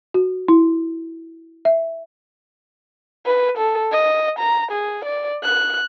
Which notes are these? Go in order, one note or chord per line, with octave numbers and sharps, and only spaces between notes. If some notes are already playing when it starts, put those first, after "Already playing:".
F#4
E4
E5
B4
A4
D#5
A#5
G#4
D5
F#6